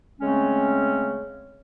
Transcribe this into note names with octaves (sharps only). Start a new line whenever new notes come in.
C#3 G#3 A3 C4 C#4